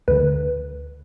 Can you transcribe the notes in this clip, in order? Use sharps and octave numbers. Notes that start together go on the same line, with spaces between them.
D2 D3 B4